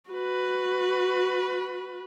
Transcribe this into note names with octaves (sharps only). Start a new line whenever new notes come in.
F#4 B4